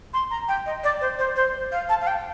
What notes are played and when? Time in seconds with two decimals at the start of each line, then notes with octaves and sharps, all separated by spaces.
0.14 C6
0.31 A#5
0.48 G5
0.66 D#5
0.84 D5
1.01 C5
1.19 C5
1.36 C5
1.72 F5
1.89 A5
2.01 F5
2.07 G5